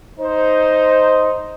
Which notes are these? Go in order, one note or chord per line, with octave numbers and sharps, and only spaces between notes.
D#4 C5